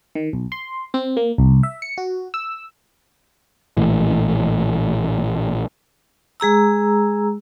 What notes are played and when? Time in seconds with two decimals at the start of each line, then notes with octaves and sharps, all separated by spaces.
0.15 D#3
0.33 B1
0.52 C6
0.94 C4
1.17 A#3
1.38 C2
1.63 E5
1.82 C#7
1.98 F#4
2.34 E6
3.77 A#1 A2 E3
6.40 G#3 G#4 A#5 E6